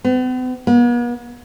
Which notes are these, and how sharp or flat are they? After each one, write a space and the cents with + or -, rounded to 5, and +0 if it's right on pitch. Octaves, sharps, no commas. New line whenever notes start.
B3 +45
B3 -45